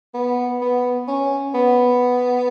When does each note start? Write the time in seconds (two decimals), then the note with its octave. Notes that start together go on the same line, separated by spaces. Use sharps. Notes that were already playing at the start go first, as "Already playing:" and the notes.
0.14 B3
0.62 B3
1.08 C#4
1.55 B3